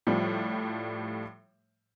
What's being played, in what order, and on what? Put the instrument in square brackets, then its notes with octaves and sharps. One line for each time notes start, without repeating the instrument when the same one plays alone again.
[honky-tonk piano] A2 F3 G3